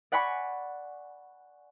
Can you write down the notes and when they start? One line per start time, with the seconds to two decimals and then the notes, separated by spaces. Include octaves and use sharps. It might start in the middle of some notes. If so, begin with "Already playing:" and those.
0.12 D5 F#5 G#5 B5 C#6